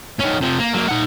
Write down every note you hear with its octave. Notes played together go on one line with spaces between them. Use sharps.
D#3 C#4
C3 F3
A#3
F#3 A#3
D#4 F#5